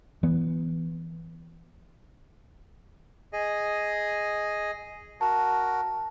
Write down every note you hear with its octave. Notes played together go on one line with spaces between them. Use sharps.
E3 B3
G#4 D#5
F#4 A#4 A5